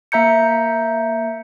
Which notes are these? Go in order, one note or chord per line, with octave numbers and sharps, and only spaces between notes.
A#3 E5 A#5 G6 C#7